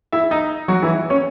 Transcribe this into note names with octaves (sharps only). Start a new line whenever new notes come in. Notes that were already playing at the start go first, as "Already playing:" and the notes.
E4 E5
D#4 D#5
F#3 F#4
E3 E4
C#4 C#5